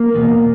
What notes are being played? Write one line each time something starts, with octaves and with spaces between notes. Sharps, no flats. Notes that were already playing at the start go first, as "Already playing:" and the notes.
Already playing: A#3
E2 B2